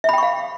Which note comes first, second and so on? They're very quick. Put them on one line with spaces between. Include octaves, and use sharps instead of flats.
E5 B5 G5 C#6 F5